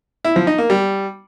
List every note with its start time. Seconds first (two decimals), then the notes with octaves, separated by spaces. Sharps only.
0.25 E4
0.36 F3
0.47 D#4
0.58 A#3
0.70 G3